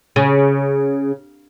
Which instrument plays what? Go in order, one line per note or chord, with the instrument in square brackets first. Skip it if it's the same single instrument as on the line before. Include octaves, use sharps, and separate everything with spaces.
[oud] C#3